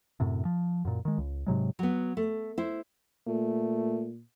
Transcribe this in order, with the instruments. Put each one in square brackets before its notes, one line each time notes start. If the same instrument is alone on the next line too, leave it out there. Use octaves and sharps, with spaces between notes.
[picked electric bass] F#2 A2 C3
F3
F#2 A#2
D#3 G#3
C#2
G#2 C3 F#3 G#3
[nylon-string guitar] F#3 B3
A3
E4 C5
[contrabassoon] A#2 [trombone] A3